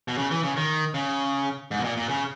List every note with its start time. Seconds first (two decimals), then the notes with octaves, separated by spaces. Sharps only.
0.08 B2
0.18 C#3
0.31 E3
0.43 C#3
0.56 D#3
0.94 C#3
1.71 G#2
1.78 B2
1.84 A#2
1.97 A#2
2.09 C#3